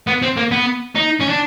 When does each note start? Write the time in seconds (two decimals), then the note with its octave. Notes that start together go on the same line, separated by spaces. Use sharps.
0.07 B3
0.22 C4
0.37 A#3
0.51 B3
0.96 D#4
1.21 C#4
1.30 D4